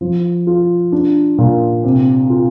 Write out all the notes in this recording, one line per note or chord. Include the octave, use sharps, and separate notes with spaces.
F3
F4
D4
A#2
C3
F4